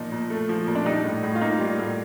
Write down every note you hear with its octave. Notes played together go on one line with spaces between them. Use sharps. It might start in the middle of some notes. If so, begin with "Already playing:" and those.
Already playing: A#2 F3 D#4
A#2
A3
F3
A#2
D4
G3 D#4
A2
A2
F4
A#3 D#4
G3
A2